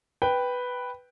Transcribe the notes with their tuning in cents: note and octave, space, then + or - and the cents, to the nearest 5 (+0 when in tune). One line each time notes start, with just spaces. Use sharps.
B4 +0 G5 +0